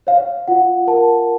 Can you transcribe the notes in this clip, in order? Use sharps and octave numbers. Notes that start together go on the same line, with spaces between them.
C#5 F5
F4 F#5
A#4 A5